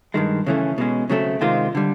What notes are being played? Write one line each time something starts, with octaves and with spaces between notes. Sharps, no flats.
G2 D#3 G#3
C#3 E3 A3 C#4
B2 G#3 C#4
C#3 F#3 A3 C4
C3 D#3 G#3 C4 F4
D3 G3